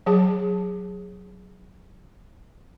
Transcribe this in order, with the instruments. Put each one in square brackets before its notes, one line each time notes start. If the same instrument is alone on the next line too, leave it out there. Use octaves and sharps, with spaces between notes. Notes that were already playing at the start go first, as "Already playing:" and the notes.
[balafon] F#3 G#4 A5